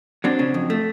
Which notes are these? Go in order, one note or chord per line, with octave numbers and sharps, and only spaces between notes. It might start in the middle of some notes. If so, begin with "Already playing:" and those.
F#3 C4 D4
C#3
F2
A3